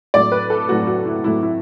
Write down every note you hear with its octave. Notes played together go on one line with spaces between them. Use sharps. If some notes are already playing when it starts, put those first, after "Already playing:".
A2 F#3 A3 D5
B4
A4
A2 F#3 A3 F#4
F#4
E4
A2 F#3 A3 E4
E4